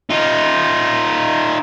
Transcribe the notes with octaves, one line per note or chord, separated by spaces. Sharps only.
D#4 F4